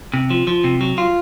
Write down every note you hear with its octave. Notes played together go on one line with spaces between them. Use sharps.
C3
F3
F3
C3
F#3
F4